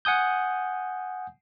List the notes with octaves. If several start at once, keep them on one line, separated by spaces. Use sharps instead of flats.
F#5 G#5 D#6 G6